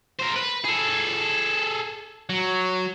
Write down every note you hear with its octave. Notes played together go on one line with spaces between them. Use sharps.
A#4 C5
B4
G#4 A4
F#3